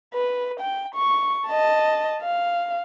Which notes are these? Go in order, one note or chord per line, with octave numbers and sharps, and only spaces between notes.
B4
G5
C#6
D#5 A5
F5